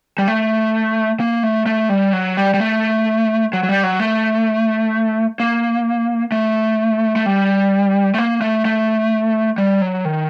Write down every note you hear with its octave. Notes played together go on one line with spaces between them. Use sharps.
G3
A3
A#3
A3
A3
G3
F#3
G3
G3
A3
F#3
F#3
G3
F#3
A3
A#3
A3
A3
G3
A3
A#3
A3
A3
G3
F#3
D#3